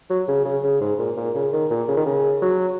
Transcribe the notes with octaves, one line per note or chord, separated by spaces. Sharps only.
F#3
C#3
C#3
C#3
G#2
A#2
A#2
C#3
D#3
A#2
C#3
D#3
C#3
F#3